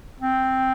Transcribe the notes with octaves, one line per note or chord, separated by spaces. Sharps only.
C4